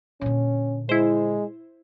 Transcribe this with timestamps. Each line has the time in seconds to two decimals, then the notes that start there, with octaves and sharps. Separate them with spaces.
0.21 A#2 D3 C#4
0.89 G#3 E4 C5